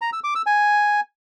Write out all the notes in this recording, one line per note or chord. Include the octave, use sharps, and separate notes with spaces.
A#5
E6
D6
E6
G#5